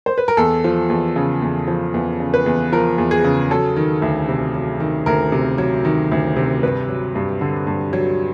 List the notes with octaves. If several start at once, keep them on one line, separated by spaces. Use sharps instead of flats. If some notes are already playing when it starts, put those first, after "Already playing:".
C5
B4
A#4
E2 A4
F3
E2
C#3
E2
F3
E2
C#3
B4
E2
F3 A#4
E2
G#4
C#3
F#3 A4
D#3
D2
C3
F#3
D#3
D2 A#4
C3
F#3
D#3
D2
C3
G2 B4
F#3
G2
D3
G2
F#3